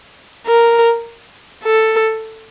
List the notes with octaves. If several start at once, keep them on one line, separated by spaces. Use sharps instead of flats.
A#4
A4